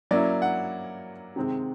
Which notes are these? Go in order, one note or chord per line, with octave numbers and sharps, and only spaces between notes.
F#3 A#3 C#4 E4 D5
F#5
C3 D#3 G#3 C4